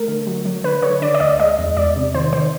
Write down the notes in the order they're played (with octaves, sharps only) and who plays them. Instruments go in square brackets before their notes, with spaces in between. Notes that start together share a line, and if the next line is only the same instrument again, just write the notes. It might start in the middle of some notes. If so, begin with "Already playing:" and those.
Already playing: [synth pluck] A3 A#4
D3
F#3
F#3
D3 B4
D3 C#5
D3 D5
D5
D2 D#5
G#3 D#5
E2
E2 D5
C3
D#3 C5
D#3 C5